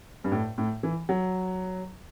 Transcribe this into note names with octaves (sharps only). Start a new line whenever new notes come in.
G2
A2
A2
E3
F#3